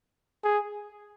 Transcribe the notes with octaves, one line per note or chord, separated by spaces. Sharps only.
G#4